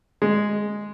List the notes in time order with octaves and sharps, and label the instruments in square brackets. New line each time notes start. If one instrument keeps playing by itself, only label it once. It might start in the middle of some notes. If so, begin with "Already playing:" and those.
[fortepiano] G#3